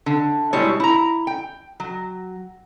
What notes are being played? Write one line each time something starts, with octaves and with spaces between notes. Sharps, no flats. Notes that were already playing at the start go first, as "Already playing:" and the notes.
D3
B2 G3 G#3 E4 C#5
E4 A#5
G5
F#3